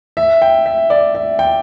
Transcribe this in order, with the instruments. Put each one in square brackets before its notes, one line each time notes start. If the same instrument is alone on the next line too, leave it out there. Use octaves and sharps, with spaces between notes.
[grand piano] E5
G5
E5
D5
E5
G5